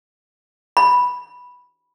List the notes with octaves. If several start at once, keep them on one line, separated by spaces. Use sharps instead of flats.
B5